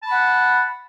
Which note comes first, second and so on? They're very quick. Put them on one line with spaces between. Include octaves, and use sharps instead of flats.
A5 B5 F#5